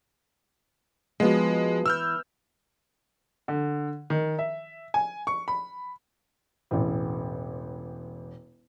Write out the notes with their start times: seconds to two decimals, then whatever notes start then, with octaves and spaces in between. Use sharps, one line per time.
1.20 F3 G#3 B3 F#4
1.86 E3 E6 F6 G6
3.48 D3
4.10 D#3
4.39 E5
4.94 G#5
5.27 C#6
5.48 B5
6.71 E1 A1